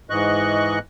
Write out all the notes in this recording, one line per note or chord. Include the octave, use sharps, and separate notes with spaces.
G#2 E3 D#5 C#6 F#6